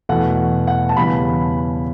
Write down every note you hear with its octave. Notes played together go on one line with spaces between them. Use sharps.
E2 B2 A3 F#5
F#5
A5
E2 C#3 G3 B3 B5